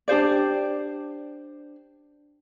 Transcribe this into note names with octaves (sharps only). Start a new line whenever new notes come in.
D4 G4 C5 D5